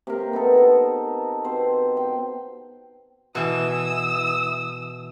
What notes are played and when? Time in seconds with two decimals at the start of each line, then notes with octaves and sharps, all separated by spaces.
0.07 C3 A#3 A#4
0.33 B3 D#4 A4
0.55 A4 A#4
1.44 B2 C4 C5
1.97 G5
3.35 B2 E3 D#6 E6